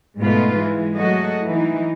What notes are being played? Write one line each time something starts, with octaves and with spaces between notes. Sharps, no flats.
G#2 B2 A3 F4 B4
E3 G#3
F#3 G#3 A3 F#4 A4 D#5
E3 D#4